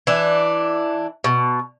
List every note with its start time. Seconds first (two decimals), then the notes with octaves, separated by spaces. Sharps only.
0.07 E3 D4
1.24 B2